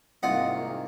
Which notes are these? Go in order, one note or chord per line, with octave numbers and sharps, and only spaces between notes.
C2 G#2 D#3 A#3 F4 D#5 F#5